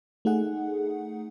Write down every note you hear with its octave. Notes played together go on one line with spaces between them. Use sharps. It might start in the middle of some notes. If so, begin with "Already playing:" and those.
A3 D#4 G#4 F#5